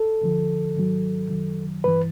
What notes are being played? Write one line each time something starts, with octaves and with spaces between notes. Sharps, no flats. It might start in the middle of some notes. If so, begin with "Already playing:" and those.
Already playing: A4
D2 D3 F3
G#2 D#3 F#3
F#2 D#3 F#3
G2 E3 B4